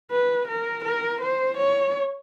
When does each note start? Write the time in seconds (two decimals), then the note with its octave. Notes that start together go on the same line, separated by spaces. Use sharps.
0.11 B4
0.48 A#4
0.84 A#4
1.21 C5
1.57 C#5